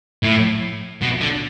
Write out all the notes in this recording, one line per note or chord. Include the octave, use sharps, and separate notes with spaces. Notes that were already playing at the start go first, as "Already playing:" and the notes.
A2
B2
D3